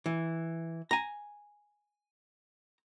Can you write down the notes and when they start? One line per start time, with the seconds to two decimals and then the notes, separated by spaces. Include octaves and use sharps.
0.06 E3
0.91 G#5 A#5